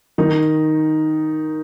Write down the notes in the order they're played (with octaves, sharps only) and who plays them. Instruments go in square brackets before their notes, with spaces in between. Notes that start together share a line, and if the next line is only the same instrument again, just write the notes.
[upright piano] D#3 D#4